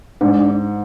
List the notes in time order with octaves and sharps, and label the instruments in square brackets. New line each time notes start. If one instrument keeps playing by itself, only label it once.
[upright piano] G#2 [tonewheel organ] D4